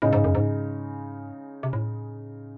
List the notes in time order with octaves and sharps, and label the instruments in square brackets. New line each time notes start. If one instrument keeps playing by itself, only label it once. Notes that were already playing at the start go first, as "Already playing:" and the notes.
[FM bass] A2 [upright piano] C#3 G#3 D#4
[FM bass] G#2
F#2
G#2
C3
A2